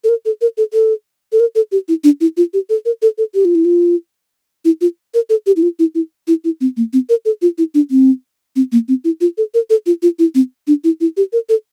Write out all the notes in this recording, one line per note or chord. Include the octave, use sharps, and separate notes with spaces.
A4
A#4
A4
A#4
A4
A4
A4
A#4
A4
G4
E4
D4
E4
F4
G4
A4
A#4
A4
A4
G4
F4
E4
F4
E4
F4
A#4
A4
G4
E4
F4
E4
E4
E4
E4
C4
A#3
C4
A#4
A4
F4
E4
D4
C4
C4
A#3
C4
E4
F4
A4
A#4
A4
F4
F4
E4
C4
D4
E4
E4
G4
A#4
A4